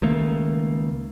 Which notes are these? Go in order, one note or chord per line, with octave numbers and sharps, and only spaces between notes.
C#2 D#3 A3 A#3